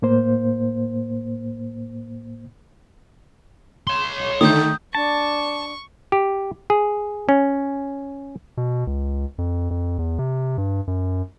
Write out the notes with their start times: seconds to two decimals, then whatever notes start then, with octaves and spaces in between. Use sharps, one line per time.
0.02 A2 A#3 C5
3.87 C#5 C6
4.41 D3 D#3 A3 D#6 G6
4.95 D4 A5 C#6
6.12 G4
6.70 G#4
7.29 C#4
8.57 B2
8.87 C#2
9.38 F2
9.71 F2
9.98 E2
10.19 C3
10.58 G2
10.87 F#2